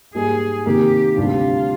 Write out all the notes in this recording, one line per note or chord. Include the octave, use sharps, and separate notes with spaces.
G#2 G3 A#3 D#4 G#4
C3 D#3 A#3 G4
D2 C3 G3 D4 F4